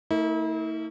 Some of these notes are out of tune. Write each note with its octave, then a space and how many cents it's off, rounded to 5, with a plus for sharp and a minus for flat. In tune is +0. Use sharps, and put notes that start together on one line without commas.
A3 +40 E4 -40 A#4 +0